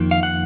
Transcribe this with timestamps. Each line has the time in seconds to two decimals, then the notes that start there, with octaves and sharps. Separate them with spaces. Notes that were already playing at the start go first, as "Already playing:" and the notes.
Already playing: F2 D#3 A#3
0.11 F5
0.23 F#5